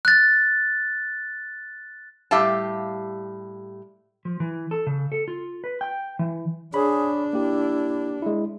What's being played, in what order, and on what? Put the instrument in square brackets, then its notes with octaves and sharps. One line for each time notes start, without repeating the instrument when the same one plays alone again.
[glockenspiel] F#6 A6
[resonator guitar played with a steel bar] A2 G3 G4 E5 F5 A5
[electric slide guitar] F3
E3
A4
C#3
A4
F4
B4
G5
E3
[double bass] D4 [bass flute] G#4 [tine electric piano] C#5 B5
[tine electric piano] A#3 G4 [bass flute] E4
[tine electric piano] G#3 E4